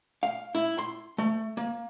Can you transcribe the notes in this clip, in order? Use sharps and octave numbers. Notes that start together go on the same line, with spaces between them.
F5
E4
C6
A3
A#3